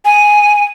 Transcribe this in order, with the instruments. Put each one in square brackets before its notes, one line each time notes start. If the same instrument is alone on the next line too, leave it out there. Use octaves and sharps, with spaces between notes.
[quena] G#5